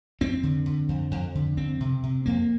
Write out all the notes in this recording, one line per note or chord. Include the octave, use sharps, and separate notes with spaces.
F2 C4
D3
D3
F2
F2
D3
F2 C4
C3
C3
F2 A#3